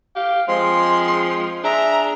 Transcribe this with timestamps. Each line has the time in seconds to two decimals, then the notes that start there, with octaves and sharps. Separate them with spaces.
0.16 G4 F5
0.48 F3 G#3 C4 C6
1.64 D4 G#4 E5 A#5